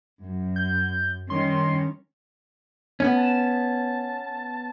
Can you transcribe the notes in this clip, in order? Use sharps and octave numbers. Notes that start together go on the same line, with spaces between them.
F#2
G6
D#3 G3 C#4 C6
B3 C#4
A5